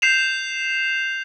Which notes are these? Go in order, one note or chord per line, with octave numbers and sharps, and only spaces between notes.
G6 C7 E7 F7